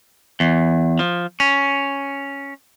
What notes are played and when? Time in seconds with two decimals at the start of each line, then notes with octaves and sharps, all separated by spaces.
0.40 E2
0.99 F3
1.40 C#4